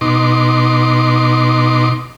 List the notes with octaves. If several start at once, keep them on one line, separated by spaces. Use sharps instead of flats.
B2 D#4 C6 D6